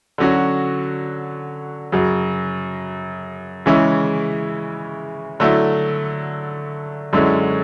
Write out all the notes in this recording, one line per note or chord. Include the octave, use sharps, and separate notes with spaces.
D3 F#3 C#4 F#4
F#2 C#3 F#3
C#3 E3 G#3 C#4 E4
D3 F#3 A3 E4
F#2 D3 G#3 C#4 E4